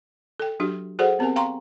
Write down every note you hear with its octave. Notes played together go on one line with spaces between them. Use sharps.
A4 G5
F#3 D4 F#4 G4
F#4 G#4 A4 C5 D5 F#5
B3 C4 G4 A#4 G#5
F5 G5 A#5 C6 C#6